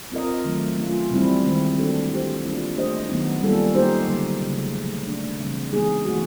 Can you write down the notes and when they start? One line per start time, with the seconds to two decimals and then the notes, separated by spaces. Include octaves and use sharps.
0.12 C4 F4 A#4 D#5
0.44 D#3 F#3 A3
0.78 A3 C#4 F4
1.11 C3 E3 G3 C4 E4
1.44 D#3 G#3 C4
1.77 E3 A3 D4 F#4 A4
2.10 G3 C4 E4 G4 C5
2.43 E3 G3 A#3 D4 F4
2.75 A3 D4 G4 C5 D#5
3.09 D#3 F#3 B3 D#4
3.42 G3 A#3 C#4 F4 A4
3.75 A#3 D#4 G4 C5
4.08 D3 F#3 A#3
4.41 C#3 F#3 A3
4.73 A#2 F3 A3
5.07 F3 A3 D4
5.39 C#3 E3 G3 C4
5.72 E3 G#3 B3 D#4 G#4
6.05 E3 A3 C#4 F#4